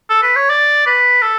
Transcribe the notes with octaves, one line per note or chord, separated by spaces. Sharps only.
A4
B4
C#5
D5
B4
A4